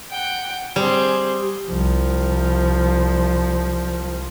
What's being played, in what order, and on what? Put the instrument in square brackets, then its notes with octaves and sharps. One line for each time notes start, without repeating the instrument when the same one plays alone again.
[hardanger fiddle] F#5 G5
[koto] G3 [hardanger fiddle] C4 G#4
[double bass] C2 F3